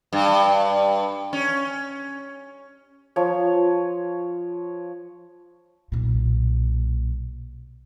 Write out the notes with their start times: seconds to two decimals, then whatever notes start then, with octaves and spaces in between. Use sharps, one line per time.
0.13 G2
1.33 C#4
3.16 F3 C#5
5.92 B1 A#2